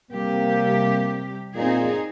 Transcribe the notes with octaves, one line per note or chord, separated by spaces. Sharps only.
C3 G3 A#3 G4
A#2 C4 D#4 G#4